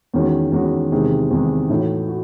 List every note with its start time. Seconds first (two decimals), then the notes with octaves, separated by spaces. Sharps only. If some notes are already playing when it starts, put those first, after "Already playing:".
0.14 E2 D#3 G#3 C#4 F#4
0.52 E2 D#3 G#3 C#4 F#4
0.92 E2 C3 D#3 G#3
1.31 E2 C3 D#3 G#3
1.70 A2 E3 A3 D#4 F#4
2.08 F#4